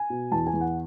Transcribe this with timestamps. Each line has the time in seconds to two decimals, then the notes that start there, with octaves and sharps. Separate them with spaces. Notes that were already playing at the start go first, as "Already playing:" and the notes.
Already playing: G#5
0.10 B2
0.32 E2 A5
0.46 G#5
0.53 E2
0.61 F#5